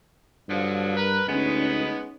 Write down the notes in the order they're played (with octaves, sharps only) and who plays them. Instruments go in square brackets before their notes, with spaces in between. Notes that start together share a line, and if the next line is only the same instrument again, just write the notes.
[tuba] G2 [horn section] D3 F3 F#3
[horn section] A#4 B4
[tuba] D2 [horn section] G#3 B3 [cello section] C#4 D#4 B4